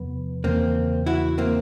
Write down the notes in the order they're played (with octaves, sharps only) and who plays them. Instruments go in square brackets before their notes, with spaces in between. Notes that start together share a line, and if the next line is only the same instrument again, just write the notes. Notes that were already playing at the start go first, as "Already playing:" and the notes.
Already playing: [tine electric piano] E2 C3 F3 [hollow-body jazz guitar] B3
[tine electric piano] E2 C#3 E3 [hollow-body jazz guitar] A#3 C4
[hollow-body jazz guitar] E4 F#4
A#3 C4